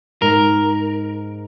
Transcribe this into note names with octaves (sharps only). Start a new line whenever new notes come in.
G#2 A#4